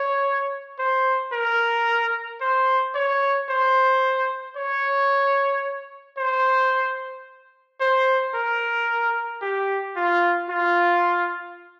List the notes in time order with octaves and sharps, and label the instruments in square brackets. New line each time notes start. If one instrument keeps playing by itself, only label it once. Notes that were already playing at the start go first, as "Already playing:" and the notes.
Already playing: [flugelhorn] C#5
C5
A#4
C5
C#5
C5
C#5
C5
C5
A#4
G4
F4
F4